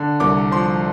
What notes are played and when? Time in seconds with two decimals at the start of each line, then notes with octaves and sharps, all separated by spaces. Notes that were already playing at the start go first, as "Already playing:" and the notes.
Already playing: D3
0.20 C2 D6
0.51 F3 C6